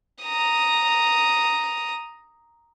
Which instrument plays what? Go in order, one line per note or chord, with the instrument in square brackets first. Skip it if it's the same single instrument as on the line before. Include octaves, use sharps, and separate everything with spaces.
[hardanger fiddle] A#5 D#6